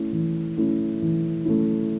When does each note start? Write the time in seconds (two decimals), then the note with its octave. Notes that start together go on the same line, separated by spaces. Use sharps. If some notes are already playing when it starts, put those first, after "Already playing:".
Already playing: A3 C#4 E4
0.13 E3
0.57 A3 C#4 E4
1.02 E3
1.45 A3 C#4 E4